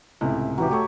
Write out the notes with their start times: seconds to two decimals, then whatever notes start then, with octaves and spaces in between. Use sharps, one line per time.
0.21 C#2 A2 C3
0.58 E3 F#3 G4
0.71 A3 G4 C#5